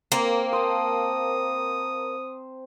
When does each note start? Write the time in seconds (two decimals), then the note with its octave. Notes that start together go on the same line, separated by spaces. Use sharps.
0.12 A#3 C4
0.53 C5 A5 D#6